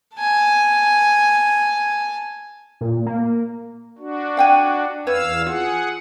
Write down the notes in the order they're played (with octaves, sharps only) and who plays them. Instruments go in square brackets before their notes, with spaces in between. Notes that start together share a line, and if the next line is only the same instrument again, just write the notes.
[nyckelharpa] G#5 A5
[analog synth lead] A#2
A#3
[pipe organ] D4 F#4
[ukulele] F5 G5 G#5
[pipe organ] E2 F5 E6 [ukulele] B4 C#5
[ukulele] F4 [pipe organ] G#4 F#5